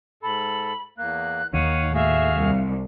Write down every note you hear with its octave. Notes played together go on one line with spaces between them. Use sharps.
G#2 A4 B5
E2 A#3 F#6
D#2 D#3 C#5 F5 F#5 D#7
A2 F#4 G#4 E5 F5
C2